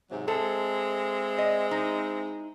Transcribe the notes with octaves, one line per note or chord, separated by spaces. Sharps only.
G#2 C3 F#3
G#3 C4 E4 A4
D#5
D#4